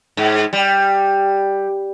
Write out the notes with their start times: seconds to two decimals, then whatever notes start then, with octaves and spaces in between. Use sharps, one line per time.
0.17 G#2
0.53 G3